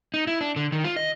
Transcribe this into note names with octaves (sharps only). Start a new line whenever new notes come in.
D#4
E4
D4
D3
D#3
F4
D#5